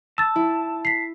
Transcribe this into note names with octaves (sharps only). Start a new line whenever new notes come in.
A5 E6 A6
E4
B6 C7